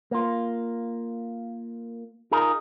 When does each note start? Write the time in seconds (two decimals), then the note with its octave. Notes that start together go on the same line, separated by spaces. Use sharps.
0.11 A#3 F4
2.31 D#4 F4 G#4 A#4